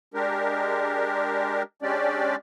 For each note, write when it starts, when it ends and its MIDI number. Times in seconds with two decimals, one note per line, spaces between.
0.14 1.63 56
0.14 1.63 62
0.14 1.63 67
0.14 1.63 70
1.82 2.36 56
1.82 2.36 61
1.82 2.36 62
1.82 2.36 67
1.82 2.36 74